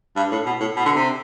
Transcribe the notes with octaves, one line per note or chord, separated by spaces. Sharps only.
G2
A2
B2
A2
B2
D3
C3